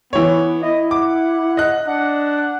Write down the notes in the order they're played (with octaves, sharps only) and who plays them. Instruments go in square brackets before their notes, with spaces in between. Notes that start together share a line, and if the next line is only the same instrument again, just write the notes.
[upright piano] E3 C#5 [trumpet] B3
[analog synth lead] E4 [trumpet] D#5
[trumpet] F#5 [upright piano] D6
[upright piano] D#5 F#6
[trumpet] D4 [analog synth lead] F#5